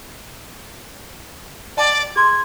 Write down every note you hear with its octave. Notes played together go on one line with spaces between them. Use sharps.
D5 D#5 G5 A5
G#4 C6 E6 G#6